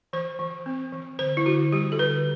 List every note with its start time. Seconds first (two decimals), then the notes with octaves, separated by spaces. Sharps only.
0.13 E3 C5
0.39 E3
0.66 C4
0.93 E3
1.19 D3 C5
1.37 E4
1.45 D3 F#4
1.72 G3 G4
1.92 A4
1.99 D3 B4